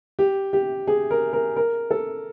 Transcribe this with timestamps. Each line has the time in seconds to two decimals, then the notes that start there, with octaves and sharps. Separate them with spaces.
0.19 G4
0.53 G4
0.87 G#4
1.11 A#4
1.33 A#4
1.56 A#4
1.91 A4